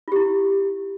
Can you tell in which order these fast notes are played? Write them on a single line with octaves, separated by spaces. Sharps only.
F4 G4 E4